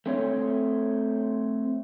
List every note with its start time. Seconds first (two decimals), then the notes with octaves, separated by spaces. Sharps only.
0.06 A3 C4 C#5